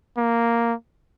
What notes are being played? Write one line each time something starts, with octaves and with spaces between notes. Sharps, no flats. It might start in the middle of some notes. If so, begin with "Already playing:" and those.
A#3